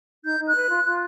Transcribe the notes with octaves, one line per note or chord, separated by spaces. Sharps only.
D#4 G6
D#4
F#6
B4
F4
F4